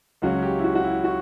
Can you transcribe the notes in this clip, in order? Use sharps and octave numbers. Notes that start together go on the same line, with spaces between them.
C#2 C#3 F#3 C#4 F#4
G4
E4
F#4
F#4
E4
F#4